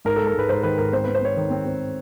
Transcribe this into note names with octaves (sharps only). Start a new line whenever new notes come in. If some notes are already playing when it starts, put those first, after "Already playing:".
G#2 A#4
G#3 A4
A#4
G#2 B4
G#2 C5
D#3 B4
G#2 A#4
C4 C5
C4 B4
C5
C4 C#5
D#3
C4
C4